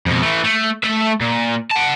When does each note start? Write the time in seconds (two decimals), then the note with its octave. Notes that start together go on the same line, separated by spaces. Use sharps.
0.06 F2 B2
0.22 E3 A3
0.44 A3
0.84 A3 E5
1.21 A#2
1.71 F#5 A5